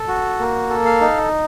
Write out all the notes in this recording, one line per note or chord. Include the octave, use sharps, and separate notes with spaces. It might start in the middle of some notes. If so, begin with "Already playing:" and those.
Already playing: A4
F#4
A#3
A4
F5
D#4